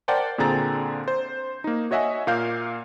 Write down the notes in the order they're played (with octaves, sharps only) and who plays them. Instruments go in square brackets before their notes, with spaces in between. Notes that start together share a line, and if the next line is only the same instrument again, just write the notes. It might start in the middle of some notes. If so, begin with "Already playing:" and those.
[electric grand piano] A#4 C5 D5 F#5 G5 A5
A#2 D3 C4 G#4 A#5 A6
C5
A#3 D#4
F#4 C#5 D#5 E5 F#5 G#5
A#2 A#3 F5 G6